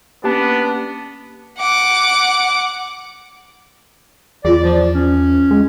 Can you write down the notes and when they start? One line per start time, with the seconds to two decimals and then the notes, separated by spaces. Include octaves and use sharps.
0.24 A#3 B3 C#4 D4 G4 A5
1.59 F#5 D6
4.45 E2 F4 G#4 D5
4.64 F3
4.95 C#4
5.51 G#3